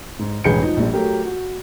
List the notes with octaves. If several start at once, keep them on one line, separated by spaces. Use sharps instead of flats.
G#2
E1 A1 G#4 B4 G6 C#7
F3 D#4
A#1 A#2 G3
F#3 A3 G4 A#4
F#4